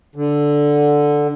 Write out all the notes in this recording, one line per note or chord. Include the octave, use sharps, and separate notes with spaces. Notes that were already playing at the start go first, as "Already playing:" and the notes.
D3